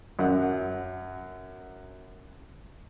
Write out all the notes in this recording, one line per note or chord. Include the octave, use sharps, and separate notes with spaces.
F#2 F#5